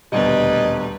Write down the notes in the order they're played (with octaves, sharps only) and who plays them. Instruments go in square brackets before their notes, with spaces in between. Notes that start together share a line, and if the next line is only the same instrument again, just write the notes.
[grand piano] D#1 D2 B2 [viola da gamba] G3 B4 [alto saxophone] D#5